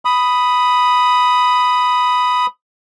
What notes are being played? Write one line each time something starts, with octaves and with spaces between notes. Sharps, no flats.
B5 D#6